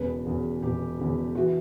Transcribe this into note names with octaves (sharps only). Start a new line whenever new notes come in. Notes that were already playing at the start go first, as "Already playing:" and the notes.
Already playing: E1 E2 C#3 B4
E1 E2 C#3
E1 E2 C#3 G4
E1 E2 C#3
E3 F#4